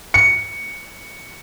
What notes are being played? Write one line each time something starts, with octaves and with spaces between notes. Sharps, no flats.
C#7